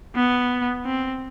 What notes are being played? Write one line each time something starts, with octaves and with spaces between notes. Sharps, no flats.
B3
C4